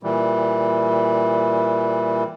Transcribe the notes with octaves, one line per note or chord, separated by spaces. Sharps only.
A#2 E3 G3